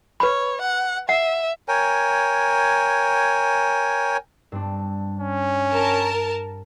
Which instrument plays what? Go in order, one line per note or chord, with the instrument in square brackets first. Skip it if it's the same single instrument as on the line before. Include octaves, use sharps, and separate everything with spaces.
[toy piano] B4 B5 [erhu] C#5
[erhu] F#5
[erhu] E5 [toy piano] F#5
[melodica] A#4 C#5 G5 G#5
[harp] G2 C4 D4
[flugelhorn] C#4
[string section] A#4 A5